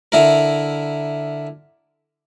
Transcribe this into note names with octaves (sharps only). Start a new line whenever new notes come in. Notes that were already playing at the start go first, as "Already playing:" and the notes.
D3 E4 A#4